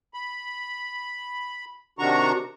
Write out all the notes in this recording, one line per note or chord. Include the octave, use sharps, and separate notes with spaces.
B5
C3 D#3 D4 F#4 A#5 C#6